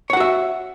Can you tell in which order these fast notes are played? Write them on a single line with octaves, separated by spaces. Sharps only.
C#5 F#5 F#4 E5